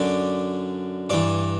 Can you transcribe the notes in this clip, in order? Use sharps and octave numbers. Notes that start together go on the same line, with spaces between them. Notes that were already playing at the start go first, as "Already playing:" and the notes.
Already playing: F#2 D3 D5
G2 E3 D5